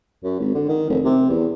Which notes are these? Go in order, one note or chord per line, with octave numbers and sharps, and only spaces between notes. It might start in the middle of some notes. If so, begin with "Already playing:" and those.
F#2
G#1
D3
D#3
F1
C3
E2